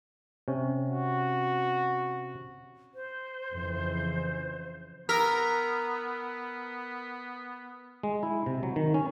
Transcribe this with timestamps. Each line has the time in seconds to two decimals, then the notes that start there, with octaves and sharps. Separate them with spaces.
0.48 C3 C#4
0.90 F#4
2.95 C5
3.51 F2 C#3 E3
5.09 B3 A#4 E6 F6 B6
8.03 G#3
8.23 E4
8.46 C3
8.63 F#3
8.76 D#3
8.94 C#4